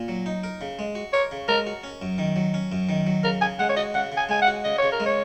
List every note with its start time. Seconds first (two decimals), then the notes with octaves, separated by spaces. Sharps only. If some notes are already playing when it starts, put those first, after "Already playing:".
Already playing: A#2
0.08 F#3
0.26 D#4
0.44 A#4
0.61 C#3
0.79 G#3
0.95 F#4
1.13 A#4 C#5
1.31 C#3
1.48 G#3 A#4
1.67 F#4
1.84 C#4
2.02 F#2
2.18 D#3
2.36 F#3
2.54 C#4
2.72 F#2
2.89 D#3
3.07 F#3
3.23 C#3 A#4
3.41 C#3 G#5
3.59 G#3 F#5
3.69 C#5
3.76 F#4 D#5
3.94 C#3 F#5
4.12 C#3
4.17 G#5
4.29 G#3 G#5
4.42 F#5
4.47 F#4
4.64 C#3 D#5
4.78 C#3 C#5
4.92 A#4
5.00 G#3
5.05 C#5